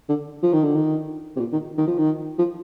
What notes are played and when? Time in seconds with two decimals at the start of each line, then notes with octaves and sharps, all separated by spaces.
0.09 D3
0.43 F3
0.53 D#3
0.63 D3
0.76 D#3
1.36 C3
1.40 A#2
1.53 D#3
1.78 D#3
1.87 F3
1.98 D#3
2.38 F3